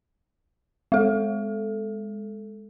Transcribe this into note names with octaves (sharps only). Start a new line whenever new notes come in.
G#3 A4